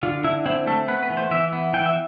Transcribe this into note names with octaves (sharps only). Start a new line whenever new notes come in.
D3 F4
D3 E4
C4 E4
A3 A4
B3 B4
B4
E3
C5
E3 E5
B3
E3 G5
E5